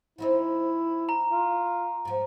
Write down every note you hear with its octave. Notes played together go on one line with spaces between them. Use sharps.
F3 C4 D#4 E4
A#5
F4
G#2 F3